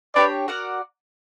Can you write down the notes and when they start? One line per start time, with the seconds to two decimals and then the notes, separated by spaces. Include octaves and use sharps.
0.15 D4 G4 B4 C#5 D5
0.48 F#4 A#4 D5 F#5